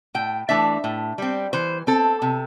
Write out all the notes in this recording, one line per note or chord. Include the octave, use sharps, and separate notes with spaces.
A2 G5
E3 A3 D4 E5
A2
G3 C4
E3 C5
C4 A4
C3